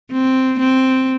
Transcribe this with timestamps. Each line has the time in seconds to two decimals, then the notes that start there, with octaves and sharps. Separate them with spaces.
0.12 C4
0.59 C4